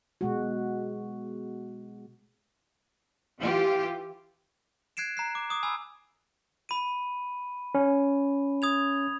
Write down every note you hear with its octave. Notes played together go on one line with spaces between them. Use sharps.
B2 G#3 F#4
E3 F4 G4
F#6 G#6 C7 D7 E7
A#5 F#6 C7
D6
D6 D#6
G#5 B5 E6
B5 D#7
C#4
D#6 G#6 F7